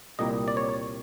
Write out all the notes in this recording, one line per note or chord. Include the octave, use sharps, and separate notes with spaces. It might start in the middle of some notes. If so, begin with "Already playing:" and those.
C2 A#2 G3 A#3 D#5
D5
C#5